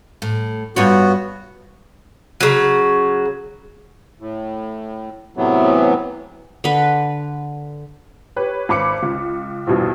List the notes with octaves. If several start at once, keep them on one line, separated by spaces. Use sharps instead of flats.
A2
G2 B3 F4 F#4 C#5
C#3 F#3
A2
A2 C3 E3 F#3 B3
D3 B4
G4 B4 C#5
G#1 B5 D6 C#7
C#2
A#1 E2 G2 B2